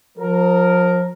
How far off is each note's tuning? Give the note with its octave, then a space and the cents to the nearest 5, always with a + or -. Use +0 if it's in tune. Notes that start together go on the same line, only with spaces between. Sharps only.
F3 +40 A#4 +0